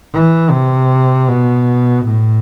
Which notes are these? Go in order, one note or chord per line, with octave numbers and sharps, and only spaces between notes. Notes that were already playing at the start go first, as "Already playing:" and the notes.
E3
C3
B2
A2